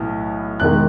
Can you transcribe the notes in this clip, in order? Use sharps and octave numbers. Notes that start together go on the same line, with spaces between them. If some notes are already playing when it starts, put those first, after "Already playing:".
Already playing: B1 A2 E3
E1 E2 D#3 G#3 F#6